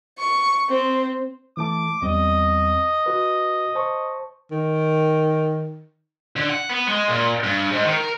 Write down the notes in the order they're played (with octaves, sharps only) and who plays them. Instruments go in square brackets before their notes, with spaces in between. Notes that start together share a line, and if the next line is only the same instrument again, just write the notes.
[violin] C#6
C4
[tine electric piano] E3 A3 A5 [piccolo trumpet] D6
[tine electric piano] E2 G3 C4 [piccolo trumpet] D#5
[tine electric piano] F#4 B4
C5 A5 C#6
[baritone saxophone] D#3
[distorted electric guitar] D3
F#5
B3
G#3
A#2
G2
G#2
D#3
A#4